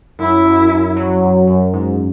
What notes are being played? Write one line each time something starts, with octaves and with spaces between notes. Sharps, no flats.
F#2 E4
F#2
F#2
F#3
F#2
F#2
G#2